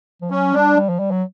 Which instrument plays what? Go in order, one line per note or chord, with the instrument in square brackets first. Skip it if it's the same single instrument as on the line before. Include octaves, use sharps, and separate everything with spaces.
[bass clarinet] F3
[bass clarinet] F#3 [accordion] C#4
[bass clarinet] G3 [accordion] D4
[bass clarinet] G3
F3
G3
F#3